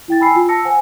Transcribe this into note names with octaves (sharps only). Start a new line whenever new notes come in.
E4 G5 A6
G5 G#5 B5 E6 C7
F4
A5 E6 A#6 C#7
C5 F#5 G#5